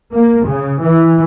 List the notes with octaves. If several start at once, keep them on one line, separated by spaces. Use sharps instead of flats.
A#3
C#3
E3